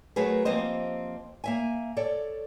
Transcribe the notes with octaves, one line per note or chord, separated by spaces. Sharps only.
F#3 A3 F#4 G#4 A#4 B4
F3 A#3 C4 G4 C5 D#5
A#3 E5 G#5
A4 C#5 D5